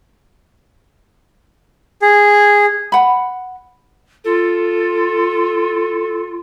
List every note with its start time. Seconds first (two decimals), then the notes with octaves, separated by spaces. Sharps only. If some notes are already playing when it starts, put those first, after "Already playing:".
2.02 G#4
2.92 F#5 B5
4.24 F4 A4